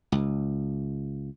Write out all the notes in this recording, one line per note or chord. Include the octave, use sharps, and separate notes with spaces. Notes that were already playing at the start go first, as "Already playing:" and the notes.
C#2